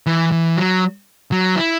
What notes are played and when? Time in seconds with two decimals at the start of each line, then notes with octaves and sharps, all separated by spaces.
0.07 E3
0.32 E3
0.57 F#3
1.32 F#3
1.56 E4